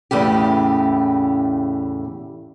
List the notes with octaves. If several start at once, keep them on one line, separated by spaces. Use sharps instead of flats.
E2 A2 C#3 G4